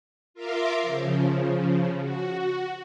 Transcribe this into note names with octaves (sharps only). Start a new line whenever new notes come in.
F4 A#4 E5 A#5 C6 D6
C#3 F3
F#4